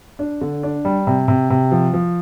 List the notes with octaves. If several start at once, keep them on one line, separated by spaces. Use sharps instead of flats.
D4
D3
D4
G3
C3
C3
C3
F3
F3